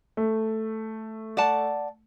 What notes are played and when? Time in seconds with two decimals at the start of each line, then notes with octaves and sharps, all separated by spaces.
0.17 A3
1.37 D5 F#5 A5